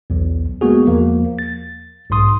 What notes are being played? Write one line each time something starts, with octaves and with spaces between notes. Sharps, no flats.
B1 E2
G#3 A#3 B3 F#4 G#4
E2 F3 A#3
A6
B1 G#2 C6 D#6